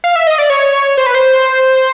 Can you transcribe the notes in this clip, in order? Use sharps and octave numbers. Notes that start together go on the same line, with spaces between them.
F5
E5
D#5
D5
C#5
C5
B4
C5